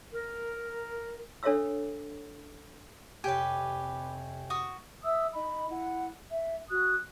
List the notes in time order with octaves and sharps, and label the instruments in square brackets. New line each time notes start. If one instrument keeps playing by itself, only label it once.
[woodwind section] A#4
[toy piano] D4 A4 C#5 E5 F5 E6
[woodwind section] F2 C3 [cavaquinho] G4 B4 [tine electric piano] C#5 G5 G#5
[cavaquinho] F#4 C#6 D#6
[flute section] E5 D#6 E6
D#4 D#5 B5
E4 F#5
E5
F#4 D#6 F#6